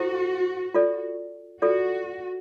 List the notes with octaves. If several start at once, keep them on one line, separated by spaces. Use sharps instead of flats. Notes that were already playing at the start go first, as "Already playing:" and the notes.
Already playing: E4 F#4 A4 C5
F4 A4 D5
F4 F#4 A4 D5